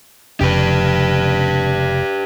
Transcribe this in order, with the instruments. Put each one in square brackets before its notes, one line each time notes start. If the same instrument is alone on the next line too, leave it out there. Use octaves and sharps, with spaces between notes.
[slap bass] F1 F2 C#3 [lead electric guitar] G4 B4